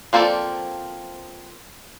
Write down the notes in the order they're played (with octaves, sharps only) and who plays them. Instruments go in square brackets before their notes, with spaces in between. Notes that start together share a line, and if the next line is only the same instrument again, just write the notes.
[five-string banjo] F3 A#3 C4 A4 D5